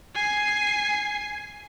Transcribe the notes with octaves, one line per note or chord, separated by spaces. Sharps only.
G#5 C7